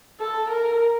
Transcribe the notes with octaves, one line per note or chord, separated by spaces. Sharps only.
A4
A#4